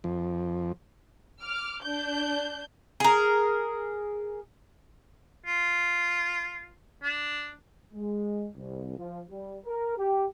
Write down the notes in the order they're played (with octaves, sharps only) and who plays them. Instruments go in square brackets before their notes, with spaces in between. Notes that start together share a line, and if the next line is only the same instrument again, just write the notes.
[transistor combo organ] F2
[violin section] D6 F6
D4 G6
[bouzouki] G#4 A#4
[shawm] F4
D4
[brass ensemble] G#3
C2
F3
G3
A#4
G4